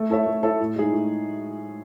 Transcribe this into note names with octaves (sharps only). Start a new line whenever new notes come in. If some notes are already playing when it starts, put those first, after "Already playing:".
Already playing: A3
E4 A4 C#5 E5
A3
E4 A4 C#5 E5
A2
G#3 D#4 G#4
A2